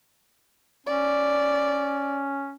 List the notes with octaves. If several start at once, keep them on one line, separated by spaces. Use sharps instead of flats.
C#4 D5